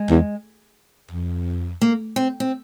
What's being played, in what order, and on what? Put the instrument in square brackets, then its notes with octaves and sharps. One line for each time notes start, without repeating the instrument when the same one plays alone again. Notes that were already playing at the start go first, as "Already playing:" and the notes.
Already playing: [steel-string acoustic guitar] G#3
[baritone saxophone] E2
F2
[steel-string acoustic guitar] A#3
C4
C4